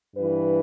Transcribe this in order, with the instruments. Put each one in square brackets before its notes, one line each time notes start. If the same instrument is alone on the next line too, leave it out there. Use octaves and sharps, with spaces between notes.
[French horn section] G2 E3 B4